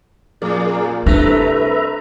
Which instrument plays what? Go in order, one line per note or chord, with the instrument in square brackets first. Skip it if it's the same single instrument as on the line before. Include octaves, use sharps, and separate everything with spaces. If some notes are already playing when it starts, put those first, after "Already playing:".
[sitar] F2 [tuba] A#2 [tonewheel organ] G#4 A#4 D5
[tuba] C2 [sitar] A3 [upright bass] D4 [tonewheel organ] B4 E5 A#5